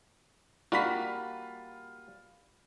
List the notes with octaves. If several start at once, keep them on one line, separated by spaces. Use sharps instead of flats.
G3 A#3 F4 F#4 B5 B6